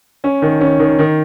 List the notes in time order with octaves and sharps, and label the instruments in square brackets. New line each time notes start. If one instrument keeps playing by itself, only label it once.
[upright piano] C#4
D#3
C#4
D#3
D#3